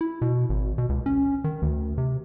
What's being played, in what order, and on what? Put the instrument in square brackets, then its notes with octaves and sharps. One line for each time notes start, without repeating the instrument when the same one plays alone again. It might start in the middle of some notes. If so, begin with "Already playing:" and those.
[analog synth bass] E4
B2
G#1
B2
C#2
C#4
D#3
D2
C3